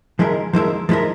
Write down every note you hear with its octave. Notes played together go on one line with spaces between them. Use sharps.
F3 G#3 E4 A#4
F3 G#3 E4 A#4
F3 G#3 E4 A#4